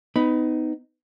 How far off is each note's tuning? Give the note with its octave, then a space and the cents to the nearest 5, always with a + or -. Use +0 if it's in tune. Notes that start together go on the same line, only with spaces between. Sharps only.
B3 +30 D#4 +0 B5 +5